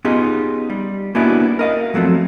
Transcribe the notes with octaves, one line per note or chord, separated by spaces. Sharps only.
B3 C#4 D#4 F4 G4 G#4
G3
A#3 B3 C#4 D4 E4 F#4
A#4 D#5 F5
F3 F#3 A3 C4